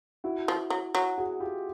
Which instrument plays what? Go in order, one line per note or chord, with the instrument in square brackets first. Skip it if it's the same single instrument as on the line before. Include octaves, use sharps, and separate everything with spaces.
[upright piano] E4 F#4
[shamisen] F3
F#3
F#3
[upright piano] F#4 G#4
F4 G4